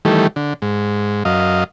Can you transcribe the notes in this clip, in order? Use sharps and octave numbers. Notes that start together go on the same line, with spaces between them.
D#3 E3 G3 A3
D3
G#2
F#2 D#5 F5